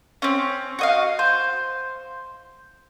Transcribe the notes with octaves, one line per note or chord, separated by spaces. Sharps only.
C4 C#4
F#4 D#5 F5
C5